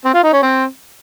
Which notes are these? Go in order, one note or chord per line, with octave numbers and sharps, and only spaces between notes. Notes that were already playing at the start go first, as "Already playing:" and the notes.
C4
F4
D#4
C#4
C4